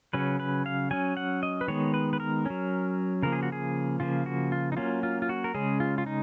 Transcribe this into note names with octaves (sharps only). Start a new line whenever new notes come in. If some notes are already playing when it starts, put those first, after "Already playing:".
C#3 F#3 C#4 B4
B4
F5
F#3 C#4 G#5
F#5
D#5
B4
D#3 G#3 B3 C#5
B4
B4
A#4
F#3 C#4
C#3 F3 A#3 A#4
G#4
F#4
G#4
C#3 F3 A#3 F4
F#4
F4
D#4
F#3 A#3 C#4 F4
F4
F4
F#4
A#4
C#3 G#3 C#4 G#4
F4
F4
D#4